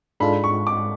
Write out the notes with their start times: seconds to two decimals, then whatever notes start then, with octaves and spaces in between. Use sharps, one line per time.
0.20 G#2 G#3 D4 F4 A4 B5
0.44 C#6
0.67 D6